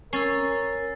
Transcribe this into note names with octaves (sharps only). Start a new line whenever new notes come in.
C#4 A#4 E6 A6 C7